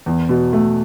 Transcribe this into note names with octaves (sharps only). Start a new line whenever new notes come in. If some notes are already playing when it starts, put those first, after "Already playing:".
E2
B2
A3